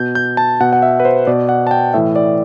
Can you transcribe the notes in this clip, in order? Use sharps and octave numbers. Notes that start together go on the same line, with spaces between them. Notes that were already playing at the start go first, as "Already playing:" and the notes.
Already playing: B2 G6
G6
A5
B2 F#5
F#5
E5
B4
C5
B2 D5
F#5
A5
G5
A2 E3 E5
D5